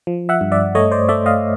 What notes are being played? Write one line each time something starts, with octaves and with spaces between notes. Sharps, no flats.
F3
E5 F#5
G2
D5 E5
A3 C#5 D#5
C5 D5
A3 D5 E5
D#5 F5